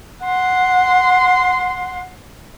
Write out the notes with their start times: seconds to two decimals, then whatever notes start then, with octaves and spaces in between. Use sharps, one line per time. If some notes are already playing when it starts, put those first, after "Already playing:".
0.23 F#5 C6